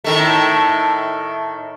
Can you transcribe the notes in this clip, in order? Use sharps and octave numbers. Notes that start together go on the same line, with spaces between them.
A2 D#3 A3